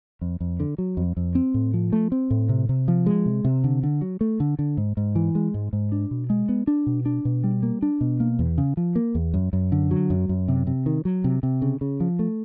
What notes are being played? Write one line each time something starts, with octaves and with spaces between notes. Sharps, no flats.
F2
F2
D3
F#3
F2
F2
C4
A2
F3
A3
C4
A2
C3
C3
F3
G#3
C3
C3
D3
D3
F#3
A3
D3
D3
G#2
G#2
E3
G#3
G#2
G#2
D4
B2
G#3
B3
D4
B2
D4
B2
G3
A#3
D4
B2
A#3
E2
C#3
F3
A#3
E2
F#2
F#2
D3
F#3
F#2
F#2
C3
C3
D#3
F#3
C3
C3
C#3
C#3
F3
A3